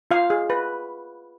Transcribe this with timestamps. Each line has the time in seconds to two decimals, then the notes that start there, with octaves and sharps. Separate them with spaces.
0.11 F4 F5
0.30 G#4
0.50 B4